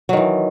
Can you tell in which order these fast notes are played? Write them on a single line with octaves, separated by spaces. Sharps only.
F#3 D#3 E3